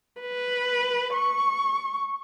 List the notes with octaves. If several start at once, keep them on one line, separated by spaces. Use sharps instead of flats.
B4
C#6